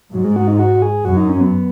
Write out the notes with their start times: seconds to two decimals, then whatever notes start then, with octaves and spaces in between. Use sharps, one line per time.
0.13 G#2 F#3
0.24 G#3
0.36 F#4
0.48 D#4
0.59 F#4
0.82 G#4
1.05 F#2 F#4
1.17 D#4
1.29 C#4
1.41 B3